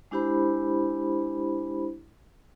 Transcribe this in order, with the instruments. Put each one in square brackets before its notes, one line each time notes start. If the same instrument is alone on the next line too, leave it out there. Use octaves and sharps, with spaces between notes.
[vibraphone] G#3 D4 E4 G4 C5 B5